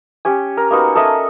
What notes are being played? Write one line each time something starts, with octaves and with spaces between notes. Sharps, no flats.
C#4 G4 G#5
A#4
A#3 B3 D#4 F#4
A4 A#4 D#5 E5